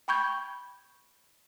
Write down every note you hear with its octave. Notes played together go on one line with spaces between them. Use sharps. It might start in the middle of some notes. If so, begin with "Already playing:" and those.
G5 B5 C#6 G6 G#6